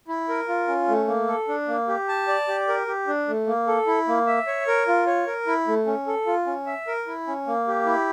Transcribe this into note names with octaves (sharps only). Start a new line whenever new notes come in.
E4
A#4
F4
C#4
A3
A#3
A4
D4
A#3
G4
A5
D5
G4
A#4
G4
D4
A3
A#3
A4
E4
A#3
E5
C#5
A#4
F4
C#5
A#4
E4
A3
C#4
A4
F4
C#4
E5
A#4
E4
C#4
A#3
G4
E4